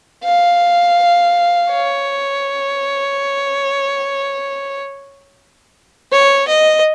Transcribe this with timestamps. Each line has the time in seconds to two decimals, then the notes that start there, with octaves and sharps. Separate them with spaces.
0.24 F5
1.72 C#5
6.12 C#5
6.48 D#5